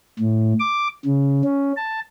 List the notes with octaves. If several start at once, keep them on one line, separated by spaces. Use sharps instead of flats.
A2
D6
C#3
C#4
A5